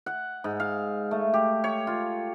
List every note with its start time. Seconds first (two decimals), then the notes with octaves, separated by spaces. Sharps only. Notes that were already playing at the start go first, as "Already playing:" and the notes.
0.06 F#5
0.44 G#2
0.60 F5
1.11 A3
1.34 G4
1.64 C#5
1.87 F4